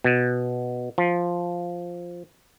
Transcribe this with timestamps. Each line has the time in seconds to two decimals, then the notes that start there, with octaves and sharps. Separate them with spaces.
0.04 B2
0.98 F3